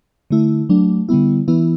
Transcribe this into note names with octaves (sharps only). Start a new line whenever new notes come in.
D3 A3 E4
F#3 A3 D4
D3 G3 B3 E4
E3 B3 E4